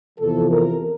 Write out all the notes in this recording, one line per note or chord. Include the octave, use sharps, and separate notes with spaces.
E2 C3 F3 A4
A#4